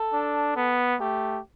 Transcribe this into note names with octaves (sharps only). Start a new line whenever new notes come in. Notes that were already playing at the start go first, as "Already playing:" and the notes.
Already playing: A4
D4
B3
A3 G4